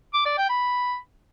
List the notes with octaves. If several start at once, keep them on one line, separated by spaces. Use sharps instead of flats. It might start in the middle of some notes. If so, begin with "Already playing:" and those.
D6
D5
G5
B5